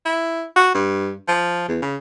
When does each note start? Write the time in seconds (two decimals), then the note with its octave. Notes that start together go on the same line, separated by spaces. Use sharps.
0.05 E4
0.56 F#4
0.74 G2
1.28 F3
1.68 E2
1.82 C#3